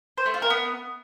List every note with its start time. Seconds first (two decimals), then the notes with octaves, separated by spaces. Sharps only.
0.17 C5
0.26 A3
0.34 F4
0.42 A#4
0.50 B3